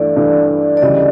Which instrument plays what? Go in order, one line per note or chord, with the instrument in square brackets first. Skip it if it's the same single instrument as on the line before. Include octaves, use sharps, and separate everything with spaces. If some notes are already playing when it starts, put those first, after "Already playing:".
Already playing: [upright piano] G2 E3 A3 [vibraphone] D5
[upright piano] G2 E3 A3
[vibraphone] D5
[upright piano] D2 C#3 E3 G3 [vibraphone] D#5